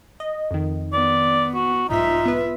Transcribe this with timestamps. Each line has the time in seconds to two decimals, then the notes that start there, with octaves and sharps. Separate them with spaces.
0.20 D#5
0.51 F2 D#3
0.93 B3 D5
1.55 F#4
1.89 B1 G#2 D#4 F4 E5 B6
2.25 B3 B4